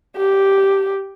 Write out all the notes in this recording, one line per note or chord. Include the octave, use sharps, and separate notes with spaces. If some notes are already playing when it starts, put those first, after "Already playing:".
G4